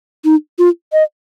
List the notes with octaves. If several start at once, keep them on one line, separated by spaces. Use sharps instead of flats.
D#4
F4
D#5